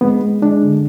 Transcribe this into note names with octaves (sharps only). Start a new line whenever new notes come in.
G#3 B3
G#3
G#3 D4
D3